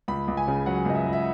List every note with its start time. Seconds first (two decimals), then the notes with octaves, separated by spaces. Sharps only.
0.08 C#2 B5
0.28 C#2
0.37 G#5
0.48 C#3
0.66 F#3 F#5
0.86 C#2 D#5
0.95 E5
1.05 C#2
1.13 E5